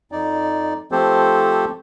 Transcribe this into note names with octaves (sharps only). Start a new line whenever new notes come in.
F2 D#4 D5
F3 A3 C4 G4 A4 C5